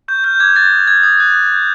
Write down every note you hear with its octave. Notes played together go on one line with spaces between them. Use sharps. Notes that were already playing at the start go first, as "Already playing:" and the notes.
C#6 G6
F6 G6
D6 G#6
F#6 A6
D#6
G6 G#6
D#6
F#6
D#6
G6